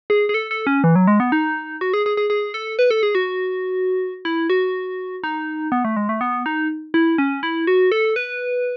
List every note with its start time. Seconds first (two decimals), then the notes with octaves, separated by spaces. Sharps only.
0.10 G#4
0.29 G#4
0.34 A4
0.51 A4
0.67 C#4
0.84 E3
0.96 F#3
1.07 G#3
1.20 B3
1.32 D#4
1.81 F#4
1.94 G#4
2.06 G#4
2.17 G#4
2.30 G#4
2.54 A4
2.79 B4
2.91 A4
3.03 G#4
3.15 F#4
4.25 E4
4.50 F#4
5.24 D#4
5.72 B3
5.85 A3
5.97 G#3
6.09 A3
6.21 B3
6.46 D#4
6.94 E4
7.18 C#4
7.43 E4
7.67 F#4
7.92 A4
8.16 B4